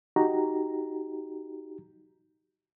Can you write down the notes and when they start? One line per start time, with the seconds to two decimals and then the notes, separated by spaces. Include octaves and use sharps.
0.16 D#4 F#4 G4 A#5